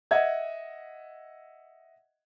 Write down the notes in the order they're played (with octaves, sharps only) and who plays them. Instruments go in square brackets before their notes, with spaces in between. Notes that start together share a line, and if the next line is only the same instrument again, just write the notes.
[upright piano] D#5 E5 F#5 G#6